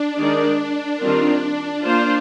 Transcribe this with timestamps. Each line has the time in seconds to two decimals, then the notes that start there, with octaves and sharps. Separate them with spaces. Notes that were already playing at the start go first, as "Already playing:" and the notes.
Already playing: D4
0.17 D#3 G#3 D#4 A#4 D5
0.99 D#3 G3 C4 F4 A#4
1.81 A#3 D4 F4 C5